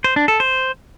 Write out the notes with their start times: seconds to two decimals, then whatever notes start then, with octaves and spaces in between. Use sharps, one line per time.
0.04 C5
0.16 D4
0.28 A4
0.40 C5